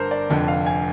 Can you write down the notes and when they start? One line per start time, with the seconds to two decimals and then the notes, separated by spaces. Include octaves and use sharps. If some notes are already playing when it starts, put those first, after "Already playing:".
Already playing: G1 G2 D3 A#4 C5
0.11 D5
0.30 F1 F2 D3
0.48 F5
0.66 G#5